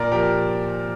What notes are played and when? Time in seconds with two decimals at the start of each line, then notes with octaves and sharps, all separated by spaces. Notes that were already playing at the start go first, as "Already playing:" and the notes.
Already playing: A#2 A#4 D5
0.12 F3 G4 A#4